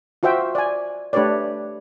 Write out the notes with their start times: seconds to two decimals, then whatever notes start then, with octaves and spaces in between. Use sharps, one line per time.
0.23 F4 F#4 C5 E5 G5
0.55 D5 G#5
1.13 A3 D4 G4 B4 C#5 D5